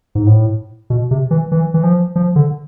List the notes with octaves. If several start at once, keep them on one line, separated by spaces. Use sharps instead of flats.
G#2
A2
B2
C3
E3
E3
E3
F3
F3
D3